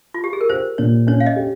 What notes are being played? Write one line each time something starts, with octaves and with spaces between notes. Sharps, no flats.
F4
G4
G#4
A#4
G4 C5
A#2 C#5
C#4 C#5
F5
D#5
G4